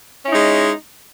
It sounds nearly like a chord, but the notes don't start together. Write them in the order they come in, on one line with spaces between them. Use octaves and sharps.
C#4 E4 D#4 G#3